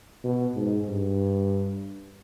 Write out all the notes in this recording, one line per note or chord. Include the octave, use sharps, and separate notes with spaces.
B2
G#2
G2